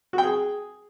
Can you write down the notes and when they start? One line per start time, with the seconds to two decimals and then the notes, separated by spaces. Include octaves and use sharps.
0.13 F#4
0.18 G5
0.23 G#4